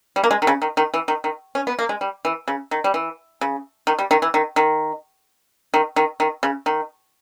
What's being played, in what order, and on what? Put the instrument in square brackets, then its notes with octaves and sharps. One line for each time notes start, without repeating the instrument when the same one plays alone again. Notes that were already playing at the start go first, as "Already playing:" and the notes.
[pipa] G3
A#3
G#3
D#3
C#3
D#3
D#3
E3
D#3
D#3
C#4
B3
A#3
G#3
G3
E3
C#3
D#3
G3
E3
C#3
D#3
G3
D#3
E3
D#3
D#3
D#3
D#3
D#3
C#3
D#3